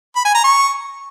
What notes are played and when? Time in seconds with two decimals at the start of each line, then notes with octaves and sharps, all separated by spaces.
0.16 B5
0.25 G#5
0.34 A#5
0.44 C#6